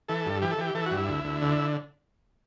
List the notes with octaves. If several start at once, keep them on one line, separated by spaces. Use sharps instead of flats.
E3 A4
G2
E3 G4
A4
E3 G4
E3 A4
F#4
G2
E4
D2
D2
D3